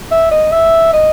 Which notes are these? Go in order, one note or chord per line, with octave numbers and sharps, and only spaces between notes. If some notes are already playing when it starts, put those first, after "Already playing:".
E5
D#5
E5
D#5